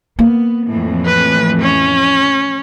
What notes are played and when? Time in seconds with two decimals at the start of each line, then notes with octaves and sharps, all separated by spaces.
0.19 A#3 B3
0.66 F2 A2 E3
1.06 B4
1.62 C#4